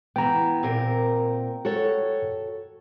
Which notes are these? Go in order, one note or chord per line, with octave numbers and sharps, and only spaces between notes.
E3 B3 G5 A#5
A#2 C4 A#4
F#4 A4 C#5